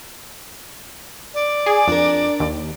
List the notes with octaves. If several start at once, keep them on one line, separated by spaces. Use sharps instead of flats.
D5
G#4
F2 D4 A#4
D#2